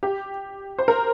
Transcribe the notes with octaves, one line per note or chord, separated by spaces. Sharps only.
G4
C5
A#4